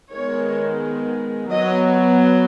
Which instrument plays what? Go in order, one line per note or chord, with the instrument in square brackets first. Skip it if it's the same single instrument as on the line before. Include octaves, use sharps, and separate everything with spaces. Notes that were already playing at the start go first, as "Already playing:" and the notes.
[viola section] D#3 G#3 B3 C#5
F#3 B3 D#5